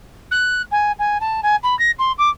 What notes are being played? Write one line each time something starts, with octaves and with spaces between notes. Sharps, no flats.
F#6
G#5
G#5
A5
G#5
B5
A#6
C6
D6